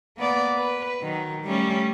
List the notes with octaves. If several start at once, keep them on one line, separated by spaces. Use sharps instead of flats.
A#3 B3 D5
B4
D#3 F#3
G3 A3 C#4